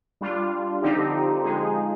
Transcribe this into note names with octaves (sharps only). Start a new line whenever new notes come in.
G3 D4 F4
D3 F3 C4 D#4 G4
F3 G#3 D#4 G#4